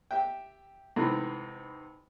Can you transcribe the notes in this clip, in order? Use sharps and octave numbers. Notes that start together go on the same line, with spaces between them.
G4 E5 G5
G#2 C3 E3 A3 B3